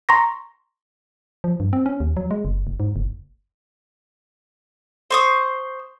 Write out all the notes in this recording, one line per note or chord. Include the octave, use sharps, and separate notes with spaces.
A#5 C6 C#6 A#6
F3
G2
C4
C#4
D#2
F#3
G#3
F#1
F1
G#2
F#1
C5 C#6 D#6